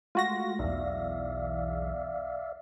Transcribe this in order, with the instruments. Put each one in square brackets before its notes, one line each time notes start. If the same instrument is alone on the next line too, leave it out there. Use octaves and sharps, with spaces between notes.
[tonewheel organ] G#3 A3 [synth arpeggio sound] F4 F#4 A#6
[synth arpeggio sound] B1 E2 [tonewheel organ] D5 E5 F5